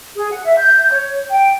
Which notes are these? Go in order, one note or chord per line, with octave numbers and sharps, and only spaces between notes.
G#4
F#5
E5
G6
C#5
G5